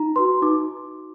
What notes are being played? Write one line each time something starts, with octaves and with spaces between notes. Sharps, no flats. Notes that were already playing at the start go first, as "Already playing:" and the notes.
Already playing: D#4 A#5
F#4 B4 C6
D#4 D6